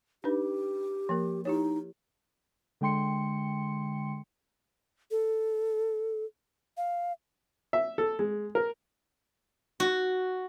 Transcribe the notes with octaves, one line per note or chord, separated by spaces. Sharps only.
D4 D#4 G4 B4
F3 A#3 A#4
D#4 E4 G4 C#5
D3 G#3 G5 C6 C#7
A4
F5
E5
A4
G#3
A#4
F#4